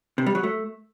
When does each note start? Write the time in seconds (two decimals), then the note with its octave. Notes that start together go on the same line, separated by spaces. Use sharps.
0.18 C3
0.26 G3
0.35 F#3
0.43 A3